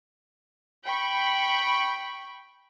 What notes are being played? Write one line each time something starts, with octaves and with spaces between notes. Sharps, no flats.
G5 B5 C#6